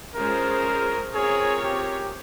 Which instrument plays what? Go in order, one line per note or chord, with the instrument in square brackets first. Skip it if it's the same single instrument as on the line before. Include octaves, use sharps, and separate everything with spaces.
[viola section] G#3 C#4 F4 G#4 C5 [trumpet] A#4
[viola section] C4 F4 A#4 C#5 [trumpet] G#4
[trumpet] G4